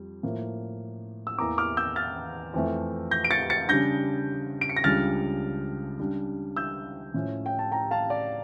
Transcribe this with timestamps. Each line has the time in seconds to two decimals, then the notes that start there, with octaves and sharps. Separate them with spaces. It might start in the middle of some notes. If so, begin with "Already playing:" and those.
Already playing: F2 G3
0.23 A2 F3 A#3
1.27 E6
1.39 E2 E3 A#3 A#5 D6
1.58 D6 F6
1.77 E6 G6
1.96 F6 A6
2.54 F2 E3 A3
3.11 G6 A#6
3.25 D7
3.31 A6 C#7
3.50 A6 C#7
3.69 C#3 G3 D4 G6 A#6
4.61 D7
4.69 C#7
4.76 A#6
4.84 C#2 C#3 G3 D4 F6 A6
5.99 C#3 G3 D4
6.56 E6 G6
7.14 A2 F3 C#4
7.46 G5
7.59 A5
7.72 G5 A#5
7.91 F5 A5
8.10 D5